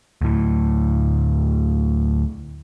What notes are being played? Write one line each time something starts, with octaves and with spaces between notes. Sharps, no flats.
D2 A2